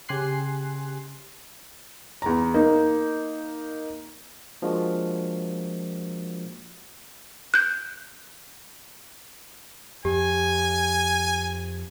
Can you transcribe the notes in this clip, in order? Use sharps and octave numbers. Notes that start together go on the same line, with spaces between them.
C#3 G4 G#5 C6 F#6 C7
E2 A#5
A#3 D#4
F3 G#3 A#3 D4 F4 F#4
F#6 G6
F2 G4 G#5